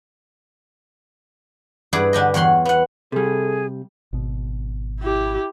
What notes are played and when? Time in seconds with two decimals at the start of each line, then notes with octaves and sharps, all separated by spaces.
1.93 G2 E4 G#4 B4 D5
2.13 D3 D4 G4 D#5
2.34 E2 C#5 F#5 C6
2.65 B3 F#5
3.12 C3 G3 G#4 A4
4.13 G#1 B2
5.00 E4 G4